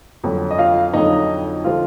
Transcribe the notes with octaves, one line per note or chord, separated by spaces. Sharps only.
F2 D3 F#3
D#5
F4 F5
F2 D3 F#3 D#4 D#5
D3 F3 F4